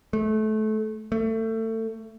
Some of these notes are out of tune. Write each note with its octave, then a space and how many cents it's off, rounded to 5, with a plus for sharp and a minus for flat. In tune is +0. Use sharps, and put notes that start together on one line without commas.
A3 -25
A3 +25